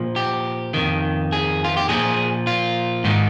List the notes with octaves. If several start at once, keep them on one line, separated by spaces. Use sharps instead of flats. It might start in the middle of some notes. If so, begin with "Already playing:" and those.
Already playing: A#2 F3
G4
F2 D#3
G#4
F4
G4
A#2 F3 G#4
F4
G#2 D#3